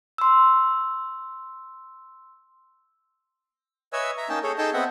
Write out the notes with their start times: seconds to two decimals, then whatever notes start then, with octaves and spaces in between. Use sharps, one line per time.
0.18 C6 E6
3.93 B4 C#5 D#5 E5 G#5 E6
4.18 E5 A#5
4.29 A#3 C#4 D#4 G5 A5
4.43 G#4 A4 C#5
4.58 D#4 G#4 A4 D#5 G5 A5
4.73 B3 C4 D#5 E5 F#5